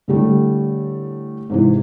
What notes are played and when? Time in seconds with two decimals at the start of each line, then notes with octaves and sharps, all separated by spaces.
0.08 A2 D3 G3 A3
1.50 G#2 C3 E3